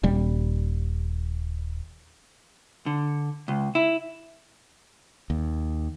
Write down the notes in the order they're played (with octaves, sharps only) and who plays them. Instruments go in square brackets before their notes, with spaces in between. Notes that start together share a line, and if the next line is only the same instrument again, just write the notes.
[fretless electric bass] D#1 G3
[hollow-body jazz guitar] D3
C#2
E4
[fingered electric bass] D#2